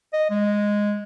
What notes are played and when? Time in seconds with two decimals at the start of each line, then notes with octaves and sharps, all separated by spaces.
0.13 D#5
0.30 G#3